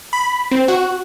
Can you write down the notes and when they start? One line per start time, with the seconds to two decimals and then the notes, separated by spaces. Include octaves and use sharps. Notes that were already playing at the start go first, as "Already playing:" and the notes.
0.13 B5
0.51 C4
0.68 F#4